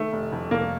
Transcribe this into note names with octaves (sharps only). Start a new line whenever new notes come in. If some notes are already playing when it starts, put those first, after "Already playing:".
Already playing: D#3 A3
F1
F2
F1 A#3